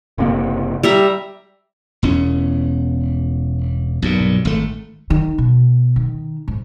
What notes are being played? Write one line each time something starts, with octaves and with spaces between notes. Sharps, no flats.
F#1 C3 A#3
G3 E5 A#5
E1 E2 C#4
B1 G2 A#2
G#1 A3
D#3
B2
D#3
G#2